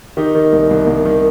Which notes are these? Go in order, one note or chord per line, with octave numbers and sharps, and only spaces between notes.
D#3 D#4 G4
D#3
C2
C2
C2
D#3